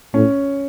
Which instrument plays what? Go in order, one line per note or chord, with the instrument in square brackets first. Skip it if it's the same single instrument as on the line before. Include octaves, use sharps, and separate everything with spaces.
[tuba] A2 [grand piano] C#4